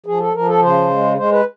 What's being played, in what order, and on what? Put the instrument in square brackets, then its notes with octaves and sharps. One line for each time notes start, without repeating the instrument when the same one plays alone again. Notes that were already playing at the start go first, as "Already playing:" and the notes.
[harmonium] F3 G#4
A4
F3 A#4
A4
C#3 C5
G#3
G#3 C5
B4